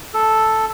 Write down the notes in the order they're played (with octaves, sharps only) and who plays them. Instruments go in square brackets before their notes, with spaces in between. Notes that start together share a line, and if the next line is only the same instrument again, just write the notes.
[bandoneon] A4